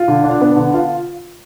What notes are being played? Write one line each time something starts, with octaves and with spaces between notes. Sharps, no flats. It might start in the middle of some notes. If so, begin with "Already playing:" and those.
Already playing: F4
D3
D4
B3
D3
F4